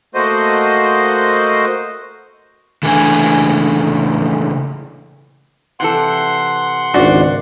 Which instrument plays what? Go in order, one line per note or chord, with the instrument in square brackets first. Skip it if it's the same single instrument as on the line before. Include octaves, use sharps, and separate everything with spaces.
[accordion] A3 A#3 F#4 C5 D#5
[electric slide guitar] C#3 E3 A3 A#3 D4 G#5
[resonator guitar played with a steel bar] C3 E3 A4 [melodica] F#5 C6
[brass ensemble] G#1 C#2 [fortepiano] D4 F#4 D5